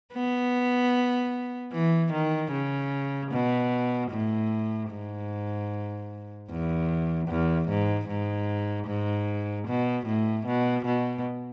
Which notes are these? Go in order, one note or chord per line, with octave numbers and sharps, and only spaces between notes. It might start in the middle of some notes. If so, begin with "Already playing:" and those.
B3
E3
D#3
C#3
B2
A2
G#2
E2
E2
G#2
G#2
G#2
B2
A2
B2
B2